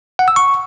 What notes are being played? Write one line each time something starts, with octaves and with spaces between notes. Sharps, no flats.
F#5
E6
C#6